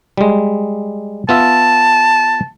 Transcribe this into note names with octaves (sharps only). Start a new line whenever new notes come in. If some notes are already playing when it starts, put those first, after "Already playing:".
G3 G#3
B3 F4 E5 A5